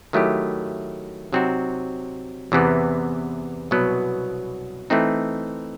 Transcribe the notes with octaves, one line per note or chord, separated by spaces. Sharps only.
D#3 F#3 A3 E4 G4
C3 F#3 C4 D#4 F#4
E2 C3 E3 B3
C2 B2 F#3 B3
E3 A3 C4 D#4